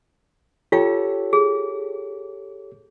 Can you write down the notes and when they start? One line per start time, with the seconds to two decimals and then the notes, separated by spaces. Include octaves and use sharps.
0.72 F4 G4 A4 C#5 F5 G5
1.33 G#4